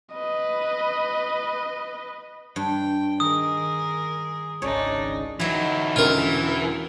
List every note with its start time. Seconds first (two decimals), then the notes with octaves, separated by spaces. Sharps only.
0.14 B4 D#5
2.56 G2 G5
3.20 D#3 G#4 A#4 D#6
4.62 G#1 C#2 D4 D#4 C#5
5.40 E3 F#3 D#4 E4
5.96 E1 D3 C#4 F4 A#4
6.18 E3